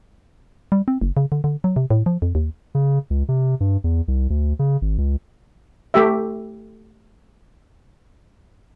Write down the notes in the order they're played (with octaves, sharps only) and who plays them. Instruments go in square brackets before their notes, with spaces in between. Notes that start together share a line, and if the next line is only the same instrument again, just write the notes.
[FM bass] G3
C4
F#1
C#3
D3
D3
F#3
C3
A2
F3
F2
D#2
[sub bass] C#3
C#2
C3
G2
E2
C2
D2
C#3
G#1
C#2
[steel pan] A3 G4 E5